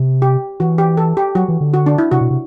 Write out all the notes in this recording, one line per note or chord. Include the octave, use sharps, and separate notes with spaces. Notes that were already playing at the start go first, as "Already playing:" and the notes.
Already playing: C3
G4
E3 F#4
G4
A4
G4
F#3 F#4
E3
D3
F#4
D4
E4
C3 F#4
B2
C3